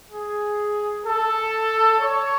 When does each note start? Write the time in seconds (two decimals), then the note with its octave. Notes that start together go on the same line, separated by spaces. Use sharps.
0.11 G#4
1.06 A4
1.99 C#5